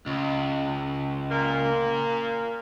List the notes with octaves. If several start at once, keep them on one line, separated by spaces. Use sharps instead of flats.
C#2
A#2 A#3